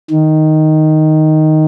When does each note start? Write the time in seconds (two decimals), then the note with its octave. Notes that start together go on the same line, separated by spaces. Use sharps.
0.11 D#3